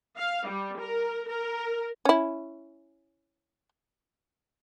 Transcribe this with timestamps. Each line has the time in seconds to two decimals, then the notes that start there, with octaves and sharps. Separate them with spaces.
0.17 F5
0.47 G3
0.79 A#4
1.29 A#4
2.05 C#4 E4